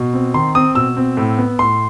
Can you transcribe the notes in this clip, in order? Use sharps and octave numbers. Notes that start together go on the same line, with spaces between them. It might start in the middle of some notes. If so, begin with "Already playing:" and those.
Already playing: B2
C4
D#3 C6
C4 D#6
B2 E6
C4
A2
B3
A2 C6